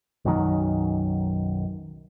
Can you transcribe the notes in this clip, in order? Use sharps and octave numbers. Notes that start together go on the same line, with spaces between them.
B1 F#2 D#3 F#3